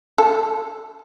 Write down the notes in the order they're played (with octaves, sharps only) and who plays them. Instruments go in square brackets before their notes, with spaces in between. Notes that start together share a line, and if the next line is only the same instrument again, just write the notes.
[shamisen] A4